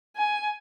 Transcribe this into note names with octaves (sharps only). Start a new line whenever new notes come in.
G#5